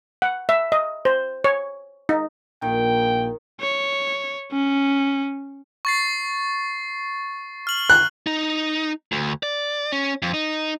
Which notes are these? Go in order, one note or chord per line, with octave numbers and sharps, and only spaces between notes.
F#5
E5
D#5
C5
C#5
D#4
A#1 A#2 D#3 G5
C#5
C#4
C#6 A6 C7
F6 F#7
F#6
D#4
D2
D5
C#4
F2
D#4